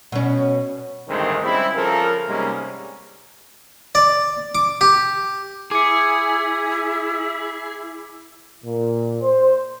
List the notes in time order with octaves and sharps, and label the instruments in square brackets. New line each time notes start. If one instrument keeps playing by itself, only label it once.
[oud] B2 C#4
[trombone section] A1 D2 G2 D#3 G#3 C4
C#3 G3 G#3 C4 E4
C#3 F3 A4 A#4
G#2 C3 G3 G#3 A#3 C#4
[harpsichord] D5
D6
G4
[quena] E4 [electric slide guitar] G#4 [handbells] D6 C#7
[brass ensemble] A#2
C5